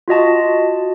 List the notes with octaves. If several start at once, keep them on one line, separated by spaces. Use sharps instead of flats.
F4 F#4 D#5 A5